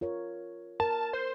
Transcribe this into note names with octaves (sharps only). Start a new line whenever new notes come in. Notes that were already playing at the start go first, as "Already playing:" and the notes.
F4 A#4 C#5
A#4 A5
C5